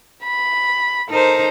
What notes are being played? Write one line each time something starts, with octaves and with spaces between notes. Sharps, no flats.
B5
D#4 A4 A#4 C5